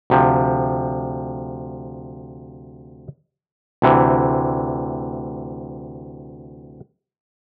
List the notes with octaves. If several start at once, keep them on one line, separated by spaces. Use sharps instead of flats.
D2 C3 F3
D2 C3 E3